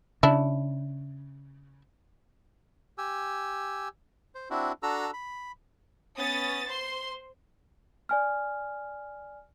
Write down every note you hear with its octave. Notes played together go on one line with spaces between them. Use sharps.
C#3 D4 E4
G4 G#5 E6
C5
C4 D4 E4 F#4
D4 F#4 A4 A#5 E6
B5
B3 C#4 D#6 A6
C5 C6
D5 G#5 F6